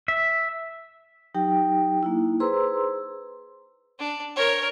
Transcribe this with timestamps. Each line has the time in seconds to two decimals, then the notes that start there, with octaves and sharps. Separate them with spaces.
0.08 E5
1.34 F#3 D#4 G4 G5
2.03 A#3 D#4 E4
2.40 G#4 B4 C5 A#5 C6 E6
3.99 D4
4.36 A#4 C#5